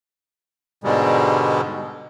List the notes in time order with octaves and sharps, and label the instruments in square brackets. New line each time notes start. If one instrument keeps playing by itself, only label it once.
[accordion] G#2 B2 D3 G3 G#3